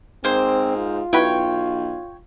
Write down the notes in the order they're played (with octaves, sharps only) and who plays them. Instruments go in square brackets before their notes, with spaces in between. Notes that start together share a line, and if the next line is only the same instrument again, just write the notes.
[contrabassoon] G#2 [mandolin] A#3 C5 [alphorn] C4
[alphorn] F4
[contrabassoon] B1 [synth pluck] E4 F#4 B4 [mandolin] C#5 G5